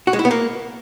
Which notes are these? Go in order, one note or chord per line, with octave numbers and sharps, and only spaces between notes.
F#4
G#3
E4
B3
A#3